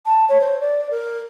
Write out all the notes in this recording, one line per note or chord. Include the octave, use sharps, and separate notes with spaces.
A5
C#5
C5
D5
A#4